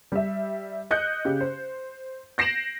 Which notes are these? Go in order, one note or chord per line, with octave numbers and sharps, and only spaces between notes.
G3 E5
D#5 F#6 G6 C#7
C#3 G4
C5
G6 A#6 C7 D7 E7 F#7